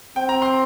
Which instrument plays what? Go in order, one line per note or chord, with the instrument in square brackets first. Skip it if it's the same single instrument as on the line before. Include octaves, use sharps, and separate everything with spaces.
[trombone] C4 [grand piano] G5
[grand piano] A#5
C6